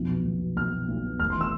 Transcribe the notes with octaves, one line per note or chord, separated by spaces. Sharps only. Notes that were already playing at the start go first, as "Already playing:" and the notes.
Already playing: B1 F2
B2
B1
B2
B1 F6
B2
B1
B2
F1 F6
C6
E3
E6